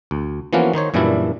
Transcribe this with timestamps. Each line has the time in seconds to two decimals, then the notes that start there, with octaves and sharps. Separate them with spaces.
0.11 D2
0.53 E3 F3 A#3 B3 C#4 F#4
0.73 D#3 D#4 C5 C#5
0.94 F#2 A#2 E3 G3 D4 E4